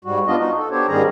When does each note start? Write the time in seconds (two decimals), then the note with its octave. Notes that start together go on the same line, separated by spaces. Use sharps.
0.05 G#2 G3 F#4
0.27 B3 D4 F4 D#5
0.39 D#4 F#4
0.58 A4
0.71 B3 D4 G4 C5 C#5
0.88 G#2 D#3 G3 C#4 G#4 A#5